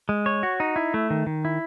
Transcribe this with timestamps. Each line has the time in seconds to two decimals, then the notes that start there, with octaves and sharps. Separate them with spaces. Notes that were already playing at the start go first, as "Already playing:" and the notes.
0.09 G#3
0.26 C#5
0.43 F#4
0.60 D#4
0.76 E4
0.94 A3
1.10 D#3
1.27 D#3
1.45 E4